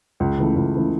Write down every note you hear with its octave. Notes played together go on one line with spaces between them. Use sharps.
C#2
C#3 E3 A3
C#2
C#3 E3 A3